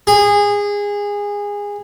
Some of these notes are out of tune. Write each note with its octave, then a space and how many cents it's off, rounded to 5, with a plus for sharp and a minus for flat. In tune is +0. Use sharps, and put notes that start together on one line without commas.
G#4 -20